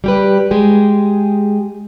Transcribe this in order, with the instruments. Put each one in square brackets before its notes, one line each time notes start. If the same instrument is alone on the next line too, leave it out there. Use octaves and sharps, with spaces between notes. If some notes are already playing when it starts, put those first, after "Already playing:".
[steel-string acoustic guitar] G3 G4 B4
G#3 G4 G#4